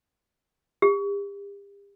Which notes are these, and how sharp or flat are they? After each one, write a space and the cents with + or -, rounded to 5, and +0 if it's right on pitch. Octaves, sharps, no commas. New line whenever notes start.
G4 +40